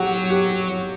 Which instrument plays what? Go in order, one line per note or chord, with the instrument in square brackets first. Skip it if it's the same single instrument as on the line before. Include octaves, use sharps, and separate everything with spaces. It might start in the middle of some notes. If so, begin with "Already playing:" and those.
Already playing: [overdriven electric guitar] F#3 [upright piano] F#4 G4
[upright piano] G4